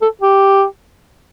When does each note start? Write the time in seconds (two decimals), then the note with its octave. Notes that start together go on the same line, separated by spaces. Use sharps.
0.02 A4
0.22 G4